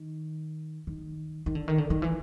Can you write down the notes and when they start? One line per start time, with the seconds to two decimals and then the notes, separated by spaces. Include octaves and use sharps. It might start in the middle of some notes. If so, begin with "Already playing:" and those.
Already playing: D#3
0.87 D#3
1.46 D#3
1.55 D3
1.68 D#3
1.78 D3
1.90 D#3
2.02 E3